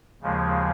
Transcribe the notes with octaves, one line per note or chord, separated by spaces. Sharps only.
D#2 C#3 F3 G#3